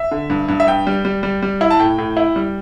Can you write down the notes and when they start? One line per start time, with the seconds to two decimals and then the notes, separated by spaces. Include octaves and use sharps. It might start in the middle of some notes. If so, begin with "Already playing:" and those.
Already playing: E5
0.11 D3
0.30 G2
0.48 G2
0.60 E5
0.67 G2 G5
0.87 G3
1.05 G3
1.23 G3
1.42 G3
1.61 E4
1.71 A5
1.80 A2 G5
1.98 A2
2.17 E4
2.36 G3